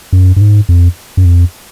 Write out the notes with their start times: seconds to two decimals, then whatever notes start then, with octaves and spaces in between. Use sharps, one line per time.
0.13 F#2
0.36 G2
0.41 G#2
0.69 F2
1.17 F#2
1.25 F2